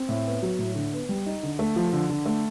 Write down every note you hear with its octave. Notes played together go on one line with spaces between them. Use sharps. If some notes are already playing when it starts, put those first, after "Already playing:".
Already playing: C4
A2
B3
F#3
A2
D3
B3
G3
D#4
D3
A3
F3
D3
D3
A3